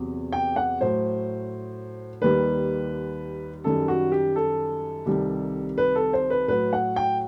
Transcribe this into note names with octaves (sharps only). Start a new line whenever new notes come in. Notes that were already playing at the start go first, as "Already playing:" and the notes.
Already playing: E2 C3 F#3
G5
F#5
A2 F#3 C5
D#2 D#3 G3 B4
F#2 D#3 G3 A4
F#4
G4
A4
C2 C3 D#3 G3
B4
A4
C5
B4
A2 F#3 B4
F#5
G5